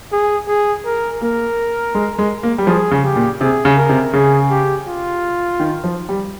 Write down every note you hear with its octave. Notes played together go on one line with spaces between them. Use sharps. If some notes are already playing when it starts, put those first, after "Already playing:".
G#4
G#4
A#4
A#3 A#4
G#3
G#3
A#3
G3
F3 G#4
C#3
G4
A#2
C3 G#4
C#3
A#4
C3
C#3 G#4
G4
F4
D#3
F3
G3